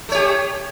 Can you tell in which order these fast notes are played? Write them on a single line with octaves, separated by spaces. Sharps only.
A3 C#5 G4